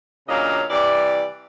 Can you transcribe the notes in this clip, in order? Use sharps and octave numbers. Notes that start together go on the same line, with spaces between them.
A#2 C#3 F#3 D4 D#5 F5
C3 E3 G3 D5